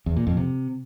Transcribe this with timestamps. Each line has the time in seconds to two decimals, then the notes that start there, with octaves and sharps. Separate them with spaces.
0.06 E2
0.16 A#2
0.27 F2
0.37 C3